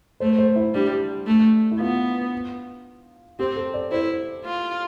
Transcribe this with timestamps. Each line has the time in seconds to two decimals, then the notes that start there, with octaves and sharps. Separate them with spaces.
0.20 A3 C5
0.38 C5
0.56 E4
0.74 G3 D4
1.27 A3
1.71 E4
1.80 B3 F4
3.39 C4 G4
3.56 A4
3.74 D5
3.91 E4 C5
4.44 F4